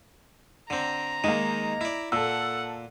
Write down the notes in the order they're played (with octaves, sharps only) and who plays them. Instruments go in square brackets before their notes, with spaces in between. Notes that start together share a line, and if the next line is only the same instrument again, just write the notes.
[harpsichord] D3 C4 [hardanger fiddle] A#5
[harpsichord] D#3 G#3 [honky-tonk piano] A#3 D#4
[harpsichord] E4 D5
[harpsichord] A#2 [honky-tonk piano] A4 E6 [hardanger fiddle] F#5